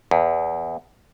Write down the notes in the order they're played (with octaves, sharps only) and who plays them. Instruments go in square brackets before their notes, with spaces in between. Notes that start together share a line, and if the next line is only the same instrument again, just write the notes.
[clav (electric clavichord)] E2